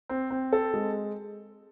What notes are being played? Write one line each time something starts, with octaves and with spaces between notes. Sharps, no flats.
C4
C4
A4
G#3